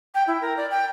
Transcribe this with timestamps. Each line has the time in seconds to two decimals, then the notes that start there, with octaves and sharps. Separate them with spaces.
0.14 G5
0.27 E4
0.41 A#4
0.57 D5
0.71 G5